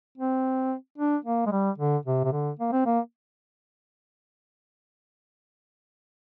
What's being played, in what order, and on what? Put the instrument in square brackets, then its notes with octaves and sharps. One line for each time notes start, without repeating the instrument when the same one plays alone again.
[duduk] C4
D4
A#3
G#3
G3
D3
C3
C3
D3
A#3
C4
A#3